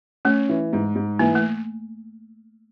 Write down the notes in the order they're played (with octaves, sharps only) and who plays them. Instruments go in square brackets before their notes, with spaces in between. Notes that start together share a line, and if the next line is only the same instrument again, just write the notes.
[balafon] A3 [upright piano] C#4
[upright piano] E3
G#2
G#2
[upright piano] E3 [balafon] A#3
[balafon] A3